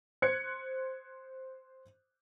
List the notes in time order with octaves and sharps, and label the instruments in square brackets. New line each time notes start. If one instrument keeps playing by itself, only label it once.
[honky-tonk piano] C5 F#6 G#6 C#7